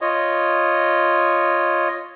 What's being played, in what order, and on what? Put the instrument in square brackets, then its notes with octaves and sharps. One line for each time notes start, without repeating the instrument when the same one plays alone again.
[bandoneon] F4 C#5 D#5